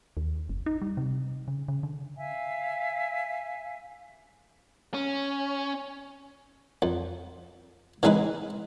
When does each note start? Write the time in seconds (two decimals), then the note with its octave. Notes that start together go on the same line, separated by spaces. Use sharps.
0.17 D#2
0.49 F#1
0.66 D#4
0.82 G3
0.97 C3
1.48 C#3
1.68 C#3
1.83 D3
2.17 E5 F5 G#5
4.94 C#4
6.82 F2
8.03 E3 G#3 C4 D#4 B4